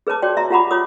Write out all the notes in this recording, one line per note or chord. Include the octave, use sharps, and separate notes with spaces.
G#4 B4 C#5 A5 D6
F#4 C#5 D5 G5
E5 A#5
F4 G4 F#5 A#5 B5 D6
F4 C#5 D6 D#6